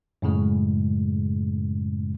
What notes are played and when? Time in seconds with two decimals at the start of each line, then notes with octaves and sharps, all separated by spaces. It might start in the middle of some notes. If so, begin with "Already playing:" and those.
0.22 F#2 A2 C#3 G#3